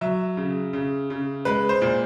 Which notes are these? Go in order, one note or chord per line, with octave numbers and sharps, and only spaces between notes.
F#3 E5
C#3
C#3
C#3
G#3 B4
C5
A#2